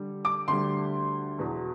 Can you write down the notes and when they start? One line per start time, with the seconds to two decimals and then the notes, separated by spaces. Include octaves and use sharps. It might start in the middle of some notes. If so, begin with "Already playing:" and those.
Already playing: D3 G3
0.25 D6
0.48 D2 D3 G3 C6
1.38 E2 B2 F#3